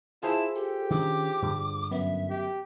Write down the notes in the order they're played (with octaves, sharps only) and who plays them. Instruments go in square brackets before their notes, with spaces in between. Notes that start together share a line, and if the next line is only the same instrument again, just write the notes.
[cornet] E4 [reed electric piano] F4 G#4 C5 [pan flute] A5
[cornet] G4 [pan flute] A4
[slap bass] D#3 C#4 D4 [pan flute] D6
[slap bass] G2 D3
[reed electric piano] F#2 B3 [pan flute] E5
[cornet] G4